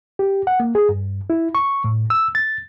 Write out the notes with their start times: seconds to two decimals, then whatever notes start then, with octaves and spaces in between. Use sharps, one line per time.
0.19 G4
0.47 F#5
0.60 A#3
0.75 G#4
0.89 G2
1.30 E4
1.55 C#6
1.84 A2
2.10 E6
2.35 A6